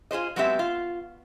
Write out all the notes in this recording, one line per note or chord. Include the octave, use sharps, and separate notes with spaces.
F4 G#4 C5 D#5
F#3 G#3 B3 C4 G4 E5
F4